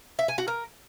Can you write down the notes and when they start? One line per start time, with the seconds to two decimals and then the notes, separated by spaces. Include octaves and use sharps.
0.19 E5
0.28 G#5
0.38 F#4
0.48 A#4